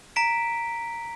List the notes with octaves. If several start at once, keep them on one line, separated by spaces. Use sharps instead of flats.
A#5 B6 D7